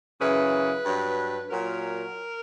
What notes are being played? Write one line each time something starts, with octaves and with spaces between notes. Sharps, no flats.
F#2 C#3 E3 B4
G2 F#3
A#2 F#3 A#4